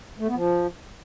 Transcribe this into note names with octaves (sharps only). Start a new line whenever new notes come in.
A3
B3
F3